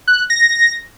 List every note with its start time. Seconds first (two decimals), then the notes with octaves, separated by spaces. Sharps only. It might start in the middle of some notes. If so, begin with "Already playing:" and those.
0.08 F#6
0.30 A#6